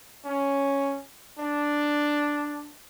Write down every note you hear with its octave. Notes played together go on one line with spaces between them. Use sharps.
C#4
D4